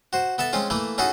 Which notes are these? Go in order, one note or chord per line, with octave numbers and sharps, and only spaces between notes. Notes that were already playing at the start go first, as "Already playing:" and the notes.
F#4 C5
B3 A4 E5 A5
G#3 C4 C#4 F4
E3 A3 A#3 E4
C#4 D#4 E4 F#4 G#4 A4